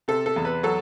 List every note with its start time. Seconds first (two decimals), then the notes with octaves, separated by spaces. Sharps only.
0.08 C3 A4
0.26 A4
0.36 E2
0.45 B4
0.63 F#3 A4